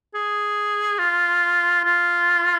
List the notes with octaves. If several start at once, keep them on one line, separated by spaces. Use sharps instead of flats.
G#4
F4
F4